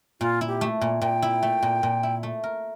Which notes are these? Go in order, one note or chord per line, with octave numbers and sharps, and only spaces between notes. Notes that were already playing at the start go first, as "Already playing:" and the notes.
A#2 F4
E4
G4
A3
A#2
A#2 G5
E4
A3
A#2
A#2
E4
A3
A#4